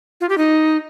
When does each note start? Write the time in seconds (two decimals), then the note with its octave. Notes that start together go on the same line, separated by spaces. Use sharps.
0.21 F4
0.29 G4
0.38 D#4